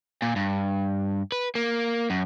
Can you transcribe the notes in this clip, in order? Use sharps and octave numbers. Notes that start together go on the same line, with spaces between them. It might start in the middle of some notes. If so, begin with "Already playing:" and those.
A#2
G2
B4
A#3
F#2